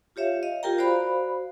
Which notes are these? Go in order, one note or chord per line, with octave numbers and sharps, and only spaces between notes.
F4 G4 C#5 E5 F5
D#5 F5
F4 G4 A#4 G5 A#5
F#4 C5 D5 F5 B5